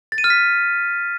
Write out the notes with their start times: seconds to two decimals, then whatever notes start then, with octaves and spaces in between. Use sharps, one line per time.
0.12 A6
0.18 D#7
0.24 F6
0.30 B6